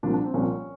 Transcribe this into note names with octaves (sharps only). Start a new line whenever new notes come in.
C2 A#2 F3 D4
D4
C4
C2 A#2 F3 C#4